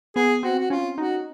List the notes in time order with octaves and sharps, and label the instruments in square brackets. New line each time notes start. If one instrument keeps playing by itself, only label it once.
[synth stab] B3 [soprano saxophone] G#4
[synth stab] C4 [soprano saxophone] F#4
[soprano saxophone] F#4
[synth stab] C#4 [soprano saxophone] F4
[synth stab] D#4 [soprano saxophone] F#4